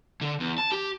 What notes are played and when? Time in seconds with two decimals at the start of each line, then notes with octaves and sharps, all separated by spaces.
0.21 D3
0.40 E2
0.58 A5
0.72 G4